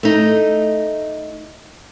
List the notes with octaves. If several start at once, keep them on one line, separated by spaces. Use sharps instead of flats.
A3 D#4